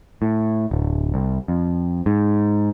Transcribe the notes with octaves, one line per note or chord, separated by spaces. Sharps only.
A2
D1
C2
F2
G#2